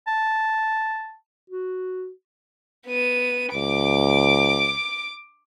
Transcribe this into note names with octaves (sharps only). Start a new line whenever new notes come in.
A5
F#4
B3 D#7
C#2 D6 D7